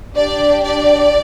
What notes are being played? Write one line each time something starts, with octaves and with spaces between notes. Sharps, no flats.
D4 G4 D5
D5